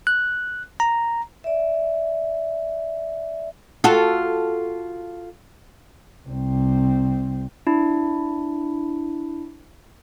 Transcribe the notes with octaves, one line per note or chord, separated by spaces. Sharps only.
F#6
A#5
D5 E5
F4 F#4 A4
C2 C4
D4 E4